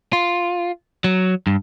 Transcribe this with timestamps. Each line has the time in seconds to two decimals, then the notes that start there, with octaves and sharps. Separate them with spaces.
0.13 F4
1.04 F#3
1.47 G2